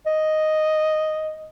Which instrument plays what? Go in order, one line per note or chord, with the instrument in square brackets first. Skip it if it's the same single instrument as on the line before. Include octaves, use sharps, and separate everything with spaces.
[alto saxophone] D#5